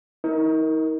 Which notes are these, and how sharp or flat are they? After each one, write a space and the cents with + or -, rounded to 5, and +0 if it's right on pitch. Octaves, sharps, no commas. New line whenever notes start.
D#4 +40 A#4 +0